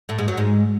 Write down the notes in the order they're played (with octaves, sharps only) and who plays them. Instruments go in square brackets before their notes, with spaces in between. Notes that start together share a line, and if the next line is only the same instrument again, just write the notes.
[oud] A2 A3
G#2 G#3
F#2 F#3
G#2 G#3